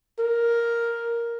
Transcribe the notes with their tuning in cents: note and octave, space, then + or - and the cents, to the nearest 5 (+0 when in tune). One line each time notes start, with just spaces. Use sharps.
A#4 +5